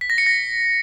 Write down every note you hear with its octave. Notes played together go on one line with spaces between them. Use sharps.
B6
A#6
C#7
A#6